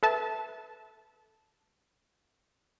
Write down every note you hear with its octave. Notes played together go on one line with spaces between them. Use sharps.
A4 B4 E5 A5